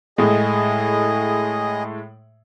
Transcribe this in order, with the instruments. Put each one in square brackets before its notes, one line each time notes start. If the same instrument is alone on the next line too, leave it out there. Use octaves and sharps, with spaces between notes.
[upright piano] A2 G#3 A3 [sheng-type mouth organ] G#4 D#5